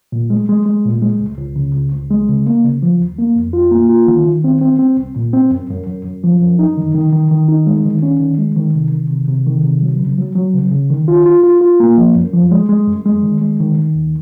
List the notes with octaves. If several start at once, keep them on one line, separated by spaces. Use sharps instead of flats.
A#2
G#3
G#3
G#3
A#2
G#3
C#2
C#2
C#3
C#2
C#2
G#3
C#3
A#3
C#3
F3
D#2
A#3
F2
F4
A#3
F4
D#3
D#3
C4
C4
C4
C2
A#2
C4
F#2
F#2
F#2
F#2
F3
F#2
D#4
D#3
D#3
D#3
D#3
D#4
G#3
D#3
C#4
D#3
G#3
D#3
C3
D#3
C3
C3
D#3
C3
F#3
C#3
F#3
F#3
C#3
C#3
D#3
F4
F4
F4
F4
A#3
F3
F#2
F3
G#3
G#3
F#2
G#3
D#3
G#3
D#3
D#3
D#2